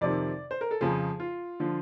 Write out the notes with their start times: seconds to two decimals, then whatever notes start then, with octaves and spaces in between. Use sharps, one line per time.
0.01 F2 C3 D#3 D5
0.51 C5
0.61 A#4
0.71 A4
0.81 F2 C#3 F3 G#4
1.20 F4
1.60 D3 F3